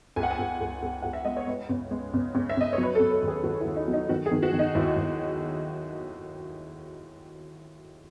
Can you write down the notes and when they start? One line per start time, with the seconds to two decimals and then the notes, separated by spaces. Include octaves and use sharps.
0.16 C#2 G#5
0.23 F#5
0.30 G#5
0.39 C#2
0.61 C#2
0.82 C#2
1.02 C#2 F#5
1.13 E5
1.25 G#3 D#5
1.37 C#5
1.47 G#3 B4
1.69 C#3
1.91 G#3
2.14 C#3
2.35 C#3
2.49 E5
2.57 C#3 D#5
2.73 C#5
2.78 F#3
2.83 B4
2.95 A4
3.00 C#3
3.11 A4
3.22 D#2
3.28 G#4
3.44 D#2 F#4
3.60 E4
3.66 D#2
3.76 D#4
3.88 F#3
3.93 D#4
4.09 D#3 F#4
4.26 G#4
4.31 D#3
4.43 F#4
4.53 D#3
4.59 D#4
4.75 D#2 E4
4.96 D#2